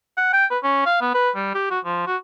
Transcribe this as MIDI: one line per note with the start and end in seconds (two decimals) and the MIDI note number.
0.17 0.30 78
0.33 0.46 79
0.51 0.59 71
0.63 0.84 61
0.86 0.97 77
1.01 1.12 59
1.14 1.30 71
1.36 1.50 55
1.54 1.66 67
1.70 1.79 66
1.85 2.03 53
2.07 2.17 66